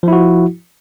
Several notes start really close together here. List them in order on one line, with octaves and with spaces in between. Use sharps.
F3 E4 F#4